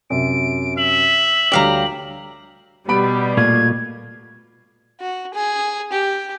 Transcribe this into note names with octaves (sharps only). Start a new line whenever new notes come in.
F#2 C3 D7
E5 F#7
D2 G3 G4 C#5 F5 A#5
B2 G3 B3 B5 D7
A#2 A3 F4 G#6
F#4
G#4
G4